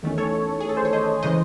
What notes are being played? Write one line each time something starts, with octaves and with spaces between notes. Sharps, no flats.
E2 D#3 A3 C#4
A4 C#5
G#4
A4
C5
C#5
C5 D#5
C#3 E3 G#3 C5 D#5